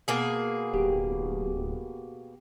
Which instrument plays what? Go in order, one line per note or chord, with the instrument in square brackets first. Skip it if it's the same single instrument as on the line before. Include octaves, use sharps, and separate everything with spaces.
[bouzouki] B2 A#3 G#4
[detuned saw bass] D1 [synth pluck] G4